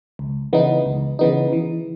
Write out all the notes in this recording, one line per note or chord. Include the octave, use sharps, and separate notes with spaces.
C#2
C#3 E3 B3 D#4
C#2
C#3 E3 B3 D#4
E3